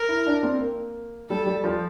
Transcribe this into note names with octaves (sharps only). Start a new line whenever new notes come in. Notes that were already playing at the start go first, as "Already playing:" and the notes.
Already playing: A#4
E4
D4
C4
A#3
G3 A4
G3
F3